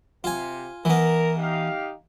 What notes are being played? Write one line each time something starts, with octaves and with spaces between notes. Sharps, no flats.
C3 F4 G#5
E3 B3 A#4
D#4 G4 F5